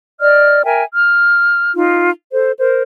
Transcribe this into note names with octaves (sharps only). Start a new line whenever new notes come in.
D5 D#5 F6
A#4 E5 G5 G#5
F6
D#4 F4
A4 C5
A#4 C5